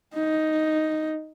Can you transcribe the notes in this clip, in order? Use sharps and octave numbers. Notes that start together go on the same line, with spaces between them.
D#4